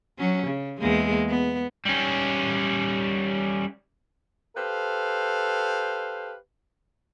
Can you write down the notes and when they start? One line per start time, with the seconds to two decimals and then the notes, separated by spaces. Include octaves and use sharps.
0.18 F#3 C#4
0.47 C#3
0.80 E2 G#3 A#3
1.28 B3
1.85 G3 C#4
4.57 G4 A4 B4 C5 F5